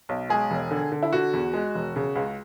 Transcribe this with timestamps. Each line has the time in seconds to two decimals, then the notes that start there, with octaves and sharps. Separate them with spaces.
0.09 B1
0.30 G#3 G#4
0.51 E1
0.71 D3
0.92 D3
1.03 E4
1.13 D3 F#4
1.34 E2
1.53 G#3
1.75 E1
1.96 C#3
2.16 C#2